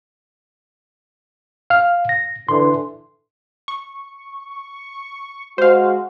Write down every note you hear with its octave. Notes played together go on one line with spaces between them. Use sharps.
F5 F6
A#6
D3 E3 C6
C#6
G#3 F#4 C5 F5